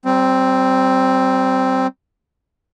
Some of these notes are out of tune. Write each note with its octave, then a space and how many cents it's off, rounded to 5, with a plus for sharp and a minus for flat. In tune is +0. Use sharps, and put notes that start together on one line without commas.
G3 -35 C4 +0